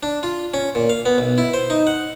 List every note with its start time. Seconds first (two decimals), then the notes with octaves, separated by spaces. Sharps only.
0.03 D4
0.23 F4
0.54 C#4
0.75 A#2
0.90 F5
1.06 B3
1.18 B1
1.38 E4
1.54 C5
1.70 D#4
1.87 F#5